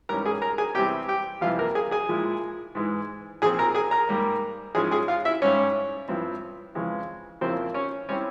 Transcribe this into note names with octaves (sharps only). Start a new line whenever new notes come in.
G#2 E3 G3 C#4 E4 A#4 A#5
G#4 G#5
A#4 A#5
G#4 G#5
E2 C3 G3 C4 E4 G4 G5
G4 G5
F2 C3 E3 G3 F4 F5
A#3 A#4
G#4 G#5
G#4 G#5
A#2 F3 G#3 E4
G#2 E3 G#3
A#2 F3 C4 G#4 G#5
A#4 A#5
G#4 G#5
A#4 A#5
G#2 G3 A#3
G#2 F3 G#3 C#4 E4 G#4 G#5
G#4 G#5
F4 F5
E4 E5
G#2 G3 C#4 C#5
G2 F3 C4 E4
F2 C#3 E3 G#3
F2 C#3 F3 A#3 C4 E4 C5
C#4 C#5
G3 C4 C#4 E4 C#5